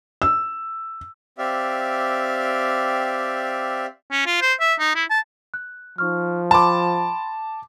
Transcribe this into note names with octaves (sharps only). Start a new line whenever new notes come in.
E6
C4 G4 D5 E5 F5
C#4
F4
C5
E5
D#4
E4
A5
F#6
F3 D#4 C#6 F6
G5 A5 B5 C6 D6